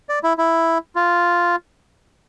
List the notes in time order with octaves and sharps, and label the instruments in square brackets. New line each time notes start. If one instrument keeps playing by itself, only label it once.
[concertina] D5
E4
E4
F4